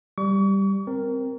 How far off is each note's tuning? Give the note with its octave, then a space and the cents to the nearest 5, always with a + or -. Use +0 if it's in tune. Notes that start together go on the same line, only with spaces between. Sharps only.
G3 +0 C#6 +40
C4 +0 A#4 +0